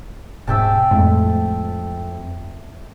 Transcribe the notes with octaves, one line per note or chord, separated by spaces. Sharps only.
D#1 G#2 B2 E5 G5 A5
F2 A2 G#3 A3